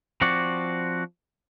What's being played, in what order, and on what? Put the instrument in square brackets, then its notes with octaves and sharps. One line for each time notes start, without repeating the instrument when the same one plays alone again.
[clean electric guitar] F3 C4 F#4 D5